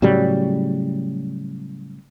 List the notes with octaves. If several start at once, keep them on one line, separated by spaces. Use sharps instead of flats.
A2 C#3 F#3 G3